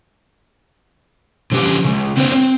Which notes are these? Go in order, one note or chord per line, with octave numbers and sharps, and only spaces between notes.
D3 F3 C#4 G4 B4
C#3 G#3
C4 D4 B4 C5
C4